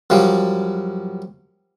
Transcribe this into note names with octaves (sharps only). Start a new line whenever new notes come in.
F#2 F3 G3